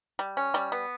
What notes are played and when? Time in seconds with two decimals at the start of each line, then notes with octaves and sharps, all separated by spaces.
0.19 G3
0.37 C#4
0.54 G3
0.72 B3